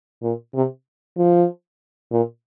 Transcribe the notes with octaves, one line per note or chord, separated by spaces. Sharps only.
A#2
C3
F3
A#2